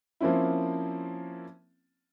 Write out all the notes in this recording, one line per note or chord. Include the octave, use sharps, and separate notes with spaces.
F3 A#3 C4 C#4 E4